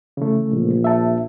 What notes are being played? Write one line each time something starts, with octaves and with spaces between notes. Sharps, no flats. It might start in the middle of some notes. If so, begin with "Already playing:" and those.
C#3 E3 A3
A#1
E5 A5